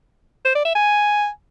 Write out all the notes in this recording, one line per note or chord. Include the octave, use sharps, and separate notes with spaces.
C5
D5
E5
G#5